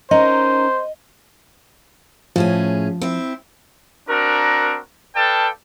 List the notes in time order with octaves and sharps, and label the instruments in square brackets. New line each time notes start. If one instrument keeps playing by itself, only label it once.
[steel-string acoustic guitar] C#4 D#4 A#4 [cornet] C5 [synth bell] D#5
[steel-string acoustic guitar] A2 C#4 G#4 [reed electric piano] F3
[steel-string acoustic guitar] C4 E4
[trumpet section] C4 D4 F#4 A#4
A4 B4 D5 F5 G5 A5